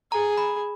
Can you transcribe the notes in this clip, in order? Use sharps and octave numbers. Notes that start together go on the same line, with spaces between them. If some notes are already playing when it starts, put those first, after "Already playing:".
G#4 A#5
B5